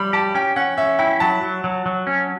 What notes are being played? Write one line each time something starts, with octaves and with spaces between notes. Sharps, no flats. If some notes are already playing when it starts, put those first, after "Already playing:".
Already playing: G3 B5
G4 A5
C#4 G5
C#4 F#5
C#4 E5
E4 G5
F#3 A5
F#3
F#3
F#3
C#4